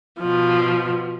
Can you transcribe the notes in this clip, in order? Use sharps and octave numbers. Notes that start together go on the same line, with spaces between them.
B2 F3